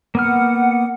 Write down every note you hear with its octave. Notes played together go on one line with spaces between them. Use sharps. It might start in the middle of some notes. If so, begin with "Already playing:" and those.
A#3 B3 F#5 F6